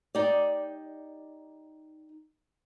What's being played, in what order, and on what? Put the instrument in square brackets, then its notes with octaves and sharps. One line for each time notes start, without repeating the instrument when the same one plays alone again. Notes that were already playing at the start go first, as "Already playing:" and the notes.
[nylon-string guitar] D#4 G4 D5